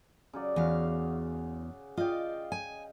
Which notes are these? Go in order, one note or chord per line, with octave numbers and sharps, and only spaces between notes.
C#3 F#3 D5
E2 F#4 G#4 F5
F4 D5 D#5 F5 G5
G#5